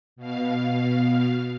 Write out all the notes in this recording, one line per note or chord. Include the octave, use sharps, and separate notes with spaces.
B2 F5